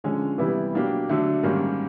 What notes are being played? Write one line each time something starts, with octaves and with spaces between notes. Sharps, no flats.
D3 F3 G#3 C#4
C3 E3 G3 B3 E4
B2 F#3 A#3 D4 G4
D3 F#3 A3 D4
G#2 D#3 G3 A#3 C#4